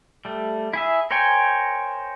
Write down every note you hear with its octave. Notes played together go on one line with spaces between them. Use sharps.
G3 A3
E4 G#4 E5
A#4 C5 C#5 G5 G#5